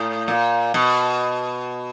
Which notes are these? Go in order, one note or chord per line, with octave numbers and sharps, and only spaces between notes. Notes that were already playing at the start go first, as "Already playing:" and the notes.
Already playing: A2
A#2
B2